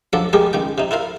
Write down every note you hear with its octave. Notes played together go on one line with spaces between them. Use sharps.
F3 F#3 D4 A4
G3 G#3 G4 G#4 A#4
C#2 D#3 G5
C3 D#4
E4 F4 A#4 F5